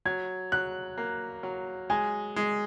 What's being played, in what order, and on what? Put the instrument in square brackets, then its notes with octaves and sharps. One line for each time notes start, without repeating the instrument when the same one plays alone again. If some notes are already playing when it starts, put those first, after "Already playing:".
[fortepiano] F#3 [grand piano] G#6
[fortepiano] F#3 [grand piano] F#6
[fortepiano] A#3
F#3
[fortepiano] G#3 [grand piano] G#5
[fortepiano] G#3